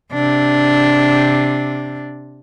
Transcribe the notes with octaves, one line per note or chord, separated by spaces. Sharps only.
C3 D4